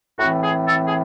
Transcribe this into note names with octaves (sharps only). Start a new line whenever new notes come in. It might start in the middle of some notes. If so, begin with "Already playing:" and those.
A2 E3 C4 F#4
G#4
A4
G#4